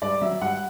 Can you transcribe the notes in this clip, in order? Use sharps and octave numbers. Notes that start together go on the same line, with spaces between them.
G2 D5
F#3 E5
G2 F#5